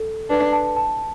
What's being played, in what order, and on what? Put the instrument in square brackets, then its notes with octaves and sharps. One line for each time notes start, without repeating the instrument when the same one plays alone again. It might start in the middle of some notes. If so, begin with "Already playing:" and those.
Already playing: [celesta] A4
[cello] D4 [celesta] B4
[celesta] A5
A5